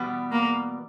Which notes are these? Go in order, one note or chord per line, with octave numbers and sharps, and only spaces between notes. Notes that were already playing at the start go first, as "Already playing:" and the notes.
Already playing: E2 B2 G3 B3
A#3